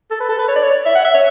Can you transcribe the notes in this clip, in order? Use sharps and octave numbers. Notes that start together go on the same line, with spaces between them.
A4
B4
A4
B4
C#5
D5
C#5
E5
F#5
E5
C#5